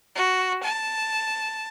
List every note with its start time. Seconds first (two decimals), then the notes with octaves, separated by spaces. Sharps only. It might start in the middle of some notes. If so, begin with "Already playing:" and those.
0.14 F#4
0.63 A5